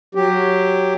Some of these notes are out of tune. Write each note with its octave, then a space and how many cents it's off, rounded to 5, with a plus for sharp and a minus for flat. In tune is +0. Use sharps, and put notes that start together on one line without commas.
F#3 +0 G4 +0